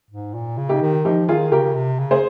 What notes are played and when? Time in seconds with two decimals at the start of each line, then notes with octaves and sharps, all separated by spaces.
0.10 G#2
0.34 A#2
0.57 C#3
0.69 D#4 G4
0.82 D#3
1.05 F3 D#4 G4
1.28 D#3 F4 G#4
1.52 C#3 G4 A#4
1.75 C3
1.99 C#3
2.11 G#4 C5